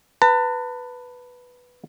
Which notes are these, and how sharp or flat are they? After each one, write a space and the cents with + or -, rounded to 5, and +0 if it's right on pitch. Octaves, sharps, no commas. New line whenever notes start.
B4 +0 A5 +40